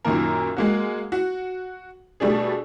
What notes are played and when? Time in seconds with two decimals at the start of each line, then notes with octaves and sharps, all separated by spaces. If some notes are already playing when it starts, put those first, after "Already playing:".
0.05 F#2 A#2 D#3 A#3 A#4
0.57 G#3 A#3 F#4
1.12 F#4
2.20 B2 G3 A3 D4 G#4